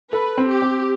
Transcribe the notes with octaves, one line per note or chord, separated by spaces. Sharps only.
A4 B4
C4
G4
C4